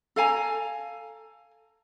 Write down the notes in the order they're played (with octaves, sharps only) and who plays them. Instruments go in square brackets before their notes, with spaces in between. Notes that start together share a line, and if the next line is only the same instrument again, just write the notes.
[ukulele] A4 F5 G#5 A#5